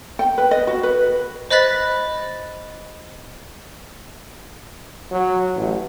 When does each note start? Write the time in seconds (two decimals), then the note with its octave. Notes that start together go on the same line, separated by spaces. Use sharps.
0.19 G5
0.38 B4
0.51 D#5
0.67 F#4
0.83 B4
1.50 C5 D#5 B5 F#6 A6 B6
5.11 F#3
5.55 A1